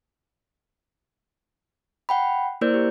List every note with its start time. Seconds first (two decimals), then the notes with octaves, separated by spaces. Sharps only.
2.09 F#5 G5 B5
2.61 A#3 E4 A#4 C5 D5 G6
2.74 G4